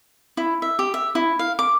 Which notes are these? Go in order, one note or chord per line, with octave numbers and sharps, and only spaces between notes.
E4
E5
G4
E5
E4
F5
D6